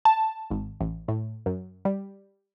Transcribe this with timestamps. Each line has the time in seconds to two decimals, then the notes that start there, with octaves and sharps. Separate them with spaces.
0.05 A5
0.51 G#1
0.81 A1
1.08 A2
1.46 F#2
1.85 G3